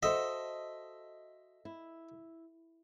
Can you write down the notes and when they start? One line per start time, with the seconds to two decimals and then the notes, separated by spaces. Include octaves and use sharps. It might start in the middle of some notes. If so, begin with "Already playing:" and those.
0.03 F#4 A4 C5 D#5 E5
1.65 E4